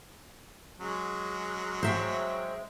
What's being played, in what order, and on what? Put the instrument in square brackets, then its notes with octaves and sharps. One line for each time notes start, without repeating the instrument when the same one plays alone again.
[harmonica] F#3 G#3 C#4
[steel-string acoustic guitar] C5 E5 G5